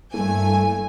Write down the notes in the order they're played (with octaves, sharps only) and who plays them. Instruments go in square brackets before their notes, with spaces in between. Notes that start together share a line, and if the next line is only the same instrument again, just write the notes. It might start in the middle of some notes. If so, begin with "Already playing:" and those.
[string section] G2 A3 G#5 [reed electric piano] A#3 E4 A4